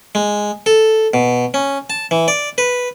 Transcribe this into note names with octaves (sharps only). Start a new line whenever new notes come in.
G#3
A4
B2
C#4
A5
E3
D5
B4